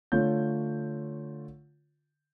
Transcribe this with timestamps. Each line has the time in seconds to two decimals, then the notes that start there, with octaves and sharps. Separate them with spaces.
0.12 D3 A3 F4 C#5 G6